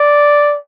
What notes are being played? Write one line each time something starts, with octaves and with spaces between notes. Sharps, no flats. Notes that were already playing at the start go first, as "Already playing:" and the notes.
Already playing: D5